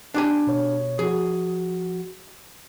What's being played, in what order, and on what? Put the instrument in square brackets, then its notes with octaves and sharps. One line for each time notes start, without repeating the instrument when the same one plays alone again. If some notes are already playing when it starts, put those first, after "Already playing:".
[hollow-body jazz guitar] D4 G4 G#5
[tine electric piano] B2 C#5
[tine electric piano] F3 F#4 [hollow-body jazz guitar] G#4